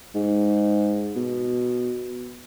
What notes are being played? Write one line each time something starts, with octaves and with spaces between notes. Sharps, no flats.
G#2
B2